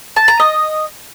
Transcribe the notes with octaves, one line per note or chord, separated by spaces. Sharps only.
A5
A#5
D#5